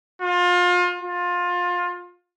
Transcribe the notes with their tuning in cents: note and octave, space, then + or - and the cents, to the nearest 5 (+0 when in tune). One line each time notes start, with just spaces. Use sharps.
F4 +30
F4 +20